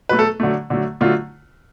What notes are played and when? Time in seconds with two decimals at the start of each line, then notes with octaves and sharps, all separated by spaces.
0.09 B2 F#3 A3 B4
0.19 A4
0.40 D3 F#3 A3
0.70 D3 F#3 A3
1.01 D3 F#3 A3 F4